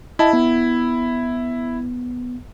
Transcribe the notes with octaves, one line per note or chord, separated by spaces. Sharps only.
E4 D#5 A5
B3